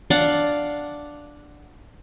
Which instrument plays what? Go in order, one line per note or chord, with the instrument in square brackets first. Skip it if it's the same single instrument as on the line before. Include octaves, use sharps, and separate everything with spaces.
[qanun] D4 F5 F#5